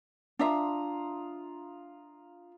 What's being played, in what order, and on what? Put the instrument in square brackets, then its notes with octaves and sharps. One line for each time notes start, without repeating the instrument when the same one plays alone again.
[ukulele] D4 E5 [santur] F4 A#5 D#6